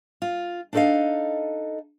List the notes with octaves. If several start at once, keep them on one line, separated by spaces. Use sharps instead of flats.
F4
D4 D#4 A4 B4 D#5 F5